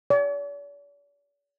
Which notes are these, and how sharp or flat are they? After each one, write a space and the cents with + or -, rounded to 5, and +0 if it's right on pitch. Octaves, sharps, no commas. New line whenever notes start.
D5 -45